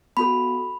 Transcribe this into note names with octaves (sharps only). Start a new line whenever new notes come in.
B3 F#4 A4 B5